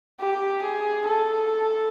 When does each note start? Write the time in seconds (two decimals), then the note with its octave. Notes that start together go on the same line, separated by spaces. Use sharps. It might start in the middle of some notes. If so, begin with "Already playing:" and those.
0.19 G4
0.62 G#4
1.06 A4